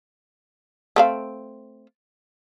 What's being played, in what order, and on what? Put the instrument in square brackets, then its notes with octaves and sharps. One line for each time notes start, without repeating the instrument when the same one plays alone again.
[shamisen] A3 C4 F5